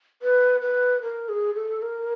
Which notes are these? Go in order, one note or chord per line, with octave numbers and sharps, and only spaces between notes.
B4
B4
A#4
G#4
A4
A#4